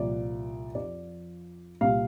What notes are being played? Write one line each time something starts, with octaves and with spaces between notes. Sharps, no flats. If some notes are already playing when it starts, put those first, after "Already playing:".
Already playing: C2 A#2 F3 D5
F2 F3 D5
C2 A#2 G3 F5